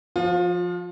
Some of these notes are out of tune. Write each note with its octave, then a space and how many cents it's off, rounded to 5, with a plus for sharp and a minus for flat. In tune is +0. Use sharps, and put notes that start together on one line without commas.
F3 +0 F4 +30 C#5 -40